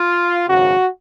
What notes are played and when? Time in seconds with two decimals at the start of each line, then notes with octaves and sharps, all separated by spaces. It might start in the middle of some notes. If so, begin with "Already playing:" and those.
Already playing: F4
0.48 G#1 F#2 C#3 F#4